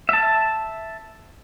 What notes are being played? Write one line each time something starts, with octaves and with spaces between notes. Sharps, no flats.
E5 A5